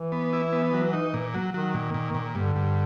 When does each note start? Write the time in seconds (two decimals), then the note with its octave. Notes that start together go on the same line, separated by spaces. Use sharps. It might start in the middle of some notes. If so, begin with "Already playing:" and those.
Already playing: E3
0.12 B3
0.33 E4
0.53 B3
0.73 F#3
0.93 D#4
1.14 A#2
1.34 F#3
1.54 D#3 F#3
1.74 A#2
1.94 A#2
2.14 A#2
2.35 G2 D3
2.56 G2